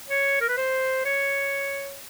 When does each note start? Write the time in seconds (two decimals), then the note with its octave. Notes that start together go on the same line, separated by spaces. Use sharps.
0.09 C#5
0.41 A#4
0.49 B4
0.57 C5
1.05 C#5